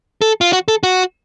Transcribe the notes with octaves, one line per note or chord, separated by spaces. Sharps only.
A4
F4
F#4
A4
F#4